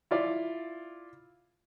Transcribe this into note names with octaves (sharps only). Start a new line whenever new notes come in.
E4 F4 D5